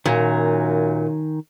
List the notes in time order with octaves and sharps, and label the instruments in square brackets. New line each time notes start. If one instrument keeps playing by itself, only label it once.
[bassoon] F#2 [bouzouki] A#2 [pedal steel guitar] D#3 G#5 A#5